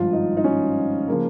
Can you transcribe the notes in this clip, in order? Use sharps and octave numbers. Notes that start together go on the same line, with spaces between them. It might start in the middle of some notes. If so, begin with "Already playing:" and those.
Already playing: G#1 G2 F3 F4
D#4
D#4
C#4
C#3 F3 A#3